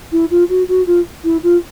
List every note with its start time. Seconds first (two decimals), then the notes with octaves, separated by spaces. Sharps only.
0.12 E4
0.30 F4
0.49 F#4
0.68 F#4
0.86 F4
1.24 E4
1.43 F4